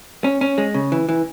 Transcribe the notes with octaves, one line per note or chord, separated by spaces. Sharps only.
C#4
C#4
G#3
C#3
E3
E3